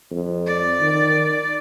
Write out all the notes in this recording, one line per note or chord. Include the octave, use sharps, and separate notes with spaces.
F2
D5
D#3